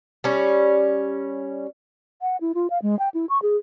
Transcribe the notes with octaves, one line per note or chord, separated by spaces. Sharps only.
G3 C#4
F#5
E4
F4
F5
G#3
G5
E4
C#6
G#4